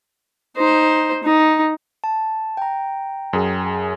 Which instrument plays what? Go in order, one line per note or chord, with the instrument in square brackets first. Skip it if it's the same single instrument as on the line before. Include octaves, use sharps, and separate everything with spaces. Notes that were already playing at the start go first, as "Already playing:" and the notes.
[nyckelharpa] D#4 C5
D#4
[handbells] A5
G5 A#5
[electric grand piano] F#2 G#4